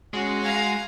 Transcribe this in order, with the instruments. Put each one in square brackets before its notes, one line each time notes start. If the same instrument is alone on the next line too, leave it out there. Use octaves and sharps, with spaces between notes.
[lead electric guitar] G#3 [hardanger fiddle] C#4 [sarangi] F#4
[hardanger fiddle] F5 A#5 [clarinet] G#5